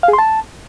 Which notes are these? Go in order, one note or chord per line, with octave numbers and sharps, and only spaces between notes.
F5
G#4
C6
A5